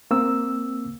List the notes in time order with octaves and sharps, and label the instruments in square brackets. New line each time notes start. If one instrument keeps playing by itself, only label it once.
[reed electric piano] A#3 C4 E6